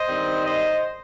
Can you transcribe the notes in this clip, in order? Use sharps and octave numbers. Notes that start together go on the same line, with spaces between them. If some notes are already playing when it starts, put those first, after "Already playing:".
Already playing: C5 D#5
G2 D#3 G3 C4 D#4
C5 D#5